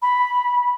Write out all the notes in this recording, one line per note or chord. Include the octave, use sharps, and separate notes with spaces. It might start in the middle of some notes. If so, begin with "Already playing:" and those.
B5